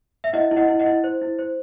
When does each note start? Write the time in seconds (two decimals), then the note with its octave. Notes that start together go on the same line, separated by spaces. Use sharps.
0.24 E5
0.33 E4 D#5 F#5
0.51 E4
0.57 D#5 F#5
0.68 E4
0.79 D#5 F#5
0.86 E4
1.04 C5
1.22 E4
1.39 C5